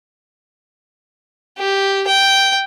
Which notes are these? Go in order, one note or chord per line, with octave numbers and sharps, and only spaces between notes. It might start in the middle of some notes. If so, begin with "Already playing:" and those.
G4
G5